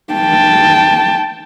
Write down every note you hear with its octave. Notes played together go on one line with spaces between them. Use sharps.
G5 A5